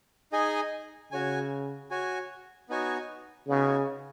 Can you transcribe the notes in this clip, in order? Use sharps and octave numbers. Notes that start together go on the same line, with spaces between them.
D#4 G#4 D#5 G#5
C#3 F#4 C#5 G#5
F#4 C#5 G#5
B3 D#4 F#4 C#5 G#5
C#3 B3 D#4 F#4 C#5 G#5